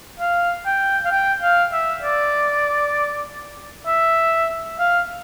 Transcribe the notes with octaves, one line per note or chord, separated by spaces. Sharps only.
F5
G5
F5
G5
F5
E5
D5
E5
F5